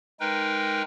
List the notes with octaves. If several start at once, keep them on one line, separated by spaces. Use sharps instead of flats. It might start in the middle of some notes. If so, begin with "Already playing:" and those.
G#3 D#4 A#4 B4 G5